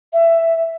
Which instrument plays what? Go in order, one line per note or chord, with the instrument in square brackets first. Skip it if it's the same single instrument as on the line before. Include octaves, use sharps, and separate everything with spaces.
[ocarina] E5